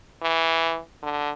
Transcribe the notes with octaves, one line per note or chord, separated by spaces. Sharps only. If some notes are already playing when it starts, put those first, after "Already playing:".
E3
D3